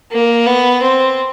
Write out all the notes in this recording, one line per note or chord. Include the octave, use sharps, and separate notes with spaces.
A#3
B3
C4